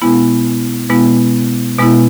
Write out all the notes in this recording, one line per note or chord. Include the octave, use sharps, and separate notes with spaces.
B2 G#3 B3 E4
B2 G#3 B3 E4
B2 G#3 B3 E4